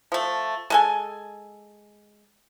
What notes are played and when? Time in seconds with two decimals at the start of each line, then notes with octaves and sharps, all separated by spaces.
0.12 F3 A3
0.70 G#3 A4 G#5